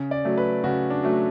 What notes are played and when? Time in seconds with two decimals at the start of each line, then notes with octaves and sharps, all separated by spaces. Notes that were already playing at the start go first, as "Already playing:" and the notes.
Already playing: C#3
0.11 D5
0.25 F#3 A3
0.38 B4
0.64 C#3 F#4
0.90 D4
1.03 F#3 A3